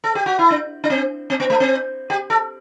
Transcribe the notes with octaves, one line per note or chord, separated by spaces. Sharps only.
A4
G4
F#4
E4
D4
D4
C4
C4
B3
A3
C4
G4
A4